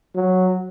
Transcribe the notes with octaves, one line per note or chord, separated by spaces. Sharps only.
F#3